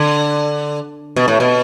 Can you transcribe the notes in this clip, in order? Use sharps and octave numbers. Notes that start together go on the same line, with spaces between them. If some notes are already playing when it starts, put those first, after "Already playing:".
Already playing: D3
B2
A2
B2